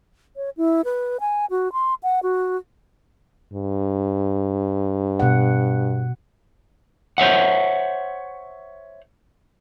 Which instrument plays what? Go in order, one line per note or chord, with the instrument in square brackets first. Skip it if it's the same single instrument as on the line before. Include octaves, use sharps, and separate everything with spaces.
[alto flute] C#5
E4
B4
G#5
F#4
C6
F#5
F#4
[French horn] G2
[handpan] B2 F#5
[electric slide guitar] C5 C#5 E5 F#5